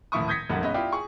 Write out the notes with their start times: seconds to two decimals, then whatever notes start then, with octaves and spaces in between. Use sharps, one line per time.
0.12 D#1 A2 F3 E4 C#6 D#6
0.28 D#6 G6 G#6 A#6 B6 C#7
0.49 A#1 F#2 D#3 G3 A3 F#5
0.61 B1 G#3 B3 C#4 D#5
0.74 E4 F4 G4 D5
0.92 G#4 C#6